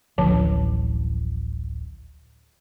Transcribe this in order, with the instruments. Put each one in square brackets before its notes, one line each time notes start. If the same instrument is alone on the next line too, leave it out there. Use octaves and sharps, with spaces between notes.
[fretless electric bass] D1 A1 [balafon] D3 F3 A5